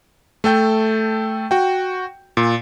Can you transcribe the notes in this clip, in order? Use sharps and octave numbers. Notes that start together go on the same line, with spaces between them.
A3 A4 G5 G6
F#4 G5
A#2